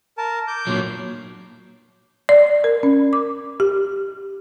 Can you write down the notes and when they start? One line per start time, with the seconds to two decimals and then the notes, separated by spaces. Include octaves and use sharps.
0.18 A#4 A5
0.48 D6 G6
0.67 A#2 F#3
2.29 D5
2.64 A#4
2.83 C#4
3.13 D6
3.60 G4